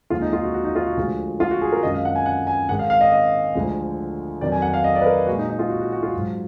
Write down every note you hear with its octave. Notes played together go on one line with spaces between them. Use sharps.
D#2 D3 F3 G#3 F4
D#4
F4
F#4
F#4
D#4
F4
F#4
D2 D3 F3 G#3
F4
F#4
G#4
A#4
F#2 D#3 G#3 D#5
F5
F#5
G#5
F#5
G#5
G#2 D#3 G#3 F#5
F5
F5
D#5
D#5
D2 D3 F3 G#3
F2 D#3 F#3 D5
G#5
F#5
F5
D#5
D5
B4
A#4
A#2 G#3 F#4
D#4
D#4
F4
F#4
F#4
F#4
F4
G#2 F#3